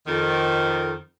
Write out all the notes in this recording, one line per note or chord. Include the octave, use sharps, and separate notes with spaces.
F2 D#3